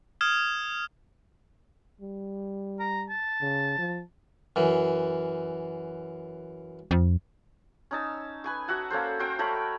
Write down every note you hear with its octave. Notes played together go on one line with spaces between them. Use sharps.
D#6 F6 G#6 E7
G3
A#5
A5
C#3
F3
F#2 E3
F2
C#4 D#4 A5 E6
B4 G#5 C#6
F#4 E5 F#5 A5
A#3 C#4 A4 C5
F#4 A#4 C5 G5
A3 A#4 C#5 B5